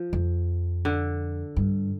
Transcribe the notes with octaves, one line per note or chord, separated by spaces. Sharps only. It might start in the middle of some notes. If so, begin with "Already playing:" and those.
Already playing: F3
F2
D3
G2